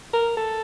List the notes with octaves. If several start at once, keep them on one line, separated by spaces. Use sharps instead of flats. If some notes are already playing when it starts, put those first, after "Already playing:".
A#4
A4